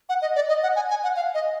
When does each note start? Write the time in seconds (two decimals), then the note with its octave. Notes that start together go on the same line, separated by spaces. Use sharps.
0.09 F#5
0.22 D#5
0.36 D5
0.49 D#5
0.63 F#5
0.76 G#5
0.90 G#5
1.04 F#5
1.16 F5
1.34 D#5